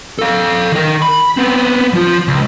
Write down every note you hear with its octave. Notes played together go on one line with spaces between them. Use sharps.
A4 F5
D#3 A#4
B5
B3 C4
F3 F4
C#2